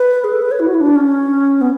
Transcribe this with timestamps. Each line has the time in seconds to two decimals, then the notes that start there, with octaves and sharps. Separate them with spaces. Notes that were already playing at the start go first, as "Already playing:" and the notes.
Already playing: B4
0.24 G#4
0.33 A4
0.42 B4
0.51 C#5
0.60 E4
0.67 F#4
0.74 E4
0.81 D4
0.96 C#4
1.61 B3